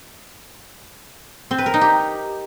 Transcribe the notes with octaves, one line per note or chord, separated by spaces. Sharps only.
C4
B4
A#4
D#4
G4